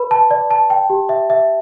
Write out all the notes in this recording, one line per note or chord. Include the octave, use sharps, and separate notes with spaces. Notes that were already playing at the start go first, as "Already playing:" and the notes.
Already playing: B4 B5
A5
D5
A5
G5
G4
E5
E5